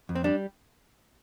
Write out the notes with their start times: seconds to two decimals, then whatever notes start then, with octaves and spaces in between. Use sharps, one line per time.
0.09 F2
0.15 C4
0.24 G3 D4